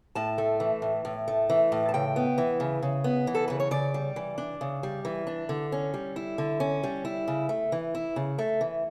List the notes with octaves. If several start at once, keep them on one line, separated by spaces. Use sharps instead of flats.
A2 A5
A3
E3
A2
A2
A3
E3
A2
A5
C#3 G5
B3
E3
C#3
C#3
B3
E3
A4
C#3 B4
C#5
C#3 D5
G3
E3
D4
C#3
G3
E3
D4
D3
C#4
G3
E4
D3
C#4
G3
E4
C#3
A3
E3
E4
C#3
A3
E3